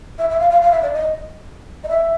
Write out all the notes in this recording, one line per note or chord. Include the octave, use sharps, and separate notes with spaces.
E5
E5
F5
F5
F5
E5
D5
D#5
D#5
E5